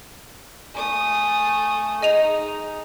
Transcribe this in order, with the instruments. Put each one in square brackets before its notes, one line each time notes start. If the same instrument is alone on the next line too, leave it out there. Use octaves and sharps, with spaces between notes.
[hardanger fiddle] A3 D#6 [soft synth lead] G#5
[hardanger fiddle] D#4 [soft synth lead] G#4 [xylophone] D#5 D#7 F7